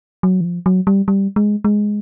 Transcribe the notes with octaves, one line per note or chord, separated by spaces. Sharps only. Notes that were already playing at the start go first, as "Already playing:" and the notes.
F#3
E3
F3
F#3
G3
G3
G#3
G#3